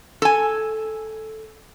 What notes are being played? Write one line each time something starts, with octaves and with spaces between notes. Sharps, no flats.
A4 G#5